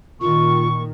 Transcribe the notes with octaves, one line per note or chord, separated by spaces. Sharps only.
A#2 D#3 F4 C#6